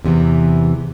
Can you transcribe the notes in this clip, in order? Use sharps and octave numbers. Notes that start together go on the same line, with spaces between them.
E2 C3 D#3 E3